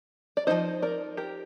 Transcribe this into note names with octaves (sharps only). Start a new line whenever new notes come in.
D5
F3 C4 D#4 C5 D#5
A#4 D5
G4 A#4